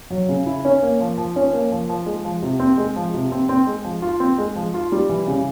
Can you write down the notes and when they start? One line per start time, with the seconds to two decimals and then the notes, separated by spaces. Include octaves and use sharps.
0.10 F#3
0.29 C#3
0.46 E4
0.65 C#4
0.82 A#3
1.00 F3
1.18 F3
1.36 C#4
1.53 A#3
1.72 F3
1.89 F3
2.06 G#3
2.25 F3
2.42 C3
2.60 C4
2.78 G#3
2.96 F3
3.14 C3
3.32 C4
3.49 C4
3.67 G#3
3.84 F3
4.02 F4
4.20 C4
4.38 G#3
4.56 F3
4.74 F4
4.92 G3
5.09 E3
5.27 C#3